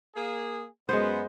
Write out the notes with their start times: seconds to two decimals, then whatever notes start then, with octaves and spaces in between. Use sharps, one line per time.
0.16 A#3 G#4
0.89 F#2 G#3 B3 B4 C5